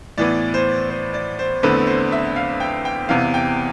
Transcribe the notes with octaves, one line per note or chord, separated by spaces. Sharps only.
A2 E3 B3 D5
C5
C5
D5
C5
E2 D3 A3 C4 B4
C5
E5
F5
G5
G5
E2 C3 E3 F5
G5